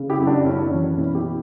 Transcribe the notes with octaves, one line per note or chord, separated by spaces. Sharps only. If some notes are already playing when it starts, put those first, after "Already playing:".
Already playing: C#3
E4 G4
F#2
D4 F#4
F#2 C#4 E4
D4
E3 C#4
B2 C#4 E4
E4 G4